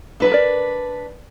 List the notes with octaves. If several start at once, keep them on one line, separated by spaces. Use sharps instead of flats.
F#3 D4 A4 B4
A#4 D5